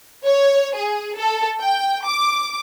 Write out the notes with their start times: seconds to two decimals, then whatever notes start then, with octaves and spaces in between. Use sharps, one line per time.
0.25 C#5
0.75 G#4
1.17 A4
1.62 G5
2.07 D6